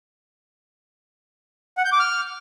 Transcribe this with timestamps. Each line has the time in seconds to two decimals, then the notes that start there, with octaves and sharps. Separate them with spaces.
1.77 F#5
1.85 G6
1.92 D6
1.99 F6